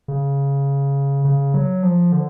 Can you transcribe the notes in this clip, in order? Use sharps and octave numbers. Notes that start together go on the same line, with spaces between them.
C#3
C#3
F#3
F3
D3